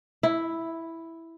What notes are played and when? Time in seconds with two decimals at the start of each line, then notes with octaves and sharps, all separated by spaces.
0.23 E4